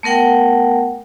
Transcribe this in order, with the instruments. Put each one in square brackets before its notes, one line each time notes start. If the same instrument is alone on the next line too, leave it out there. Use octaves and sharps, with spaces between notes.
[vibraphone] A3 B3 A#4 F#5 G5